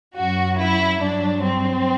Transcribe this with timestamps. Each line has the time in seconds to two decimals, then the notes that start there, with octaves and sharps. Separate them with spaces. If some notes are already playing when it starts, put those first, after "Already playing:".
0.16 F#2 F#3 F#4
0.59 E4
1.02 G2 F#3 D4
1.44 C4